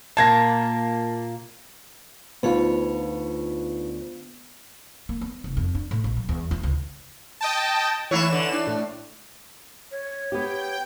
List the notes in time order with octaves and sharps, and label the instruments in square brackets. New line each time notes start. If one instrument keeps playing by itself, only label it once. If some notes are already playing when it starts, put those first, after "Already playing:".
[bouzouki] A#2 A#3 [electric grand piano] A5 G#6 A#6
[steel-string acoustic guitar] D2 C#5 [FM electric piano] B3 F4 [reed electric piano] D#4 B4
[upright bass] A#3
B3
F1
F2
D4
A2
A#1
F#3
E2
F4
C#2
[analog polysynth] D#5 G5 A5
[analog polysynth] E3 E7 [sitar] A3 E4 C#5
[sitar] D3
D4
[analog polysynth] A2
[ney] C#5
[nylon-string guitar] B3 G4 [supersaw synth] G5